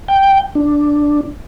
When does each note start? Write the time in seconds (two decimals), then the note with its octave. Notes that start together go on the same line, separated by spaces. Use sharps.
0.08 G5
0.55 D4